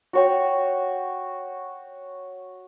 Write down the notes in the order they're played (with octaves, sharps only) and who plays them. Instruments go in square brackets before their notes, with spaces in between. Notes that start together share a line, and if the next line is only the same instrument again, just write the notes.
[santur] F#4 C#5 G5